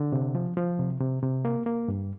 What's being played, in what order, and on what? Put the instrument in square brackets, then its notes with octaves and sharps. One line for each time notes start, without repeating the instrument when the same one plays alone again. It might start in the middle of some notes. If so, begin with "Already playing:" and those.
Already playing: [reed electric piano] D3
C3
F3
F3
C3
C3
C3
A#3
A#3
G2